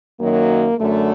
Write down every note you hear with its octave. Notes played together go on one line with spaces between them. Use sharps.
F#2 D#3 F#3 A#3
F#2 D3 F#3 A3